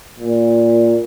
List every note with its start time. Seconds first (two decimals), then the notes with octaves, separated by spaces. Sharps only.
0.20 A#2